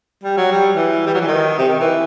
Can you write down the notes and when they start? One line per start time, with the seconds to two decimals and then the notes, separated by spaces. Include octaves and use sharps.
0.23 G3
0.37 F#3
0.52 G3
0.75 E3
1.06 G3
1.14 F#3
1.21 E3
1.28 D#3
1.58 C3
1.68 D#3
1.80 E3